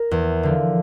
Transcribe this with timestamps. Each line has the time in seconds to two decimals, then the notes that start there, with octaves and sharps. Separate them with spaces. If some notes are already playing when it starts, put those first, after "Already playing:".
Already playing: A#4
0.11 E2
0.43 D3 F3